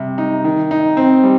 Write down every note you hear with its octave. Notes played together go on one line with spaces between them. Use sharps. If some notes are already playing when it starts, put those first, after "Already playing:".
Already playing: C3 G3
D#4
D#3
D#4
C4
G3